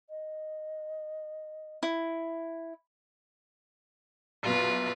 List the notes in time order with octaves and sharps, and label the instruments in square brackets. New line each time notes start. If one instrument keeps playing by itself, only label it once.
[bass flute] D#5
[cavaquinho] E4
[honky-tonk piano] A#1 F#2 B2 [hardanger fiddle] F4 B4